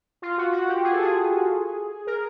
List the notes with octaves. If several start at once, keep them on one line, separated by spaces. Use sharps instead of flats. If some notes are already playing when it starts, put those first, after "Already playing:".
F4
F#4
F#4
G4
G#4
A4
G#4
A#4